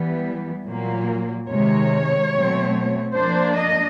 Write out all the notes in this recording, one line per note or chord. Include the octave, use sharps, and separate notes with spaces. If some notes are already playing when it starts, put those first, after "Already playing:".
Already playing: E3 G3 B3
A#2 F#3 A#3
C3 D#3 G#3 C#5
B2 F#3 A3 C4
F3 A#3 D4 C5
D#5